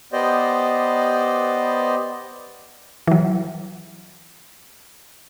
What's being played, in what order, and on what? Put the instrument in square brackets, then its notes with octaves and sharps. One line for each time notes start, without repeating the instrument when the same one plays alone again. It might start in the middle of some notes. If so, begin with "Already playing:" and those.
[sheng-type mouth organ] B3 G4 C5 D5 D#5
[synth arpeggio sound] E3 F#3